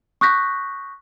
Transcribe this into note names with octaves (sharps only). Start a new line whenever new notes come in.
C#6 D#6 F#6 G6 A#6 B6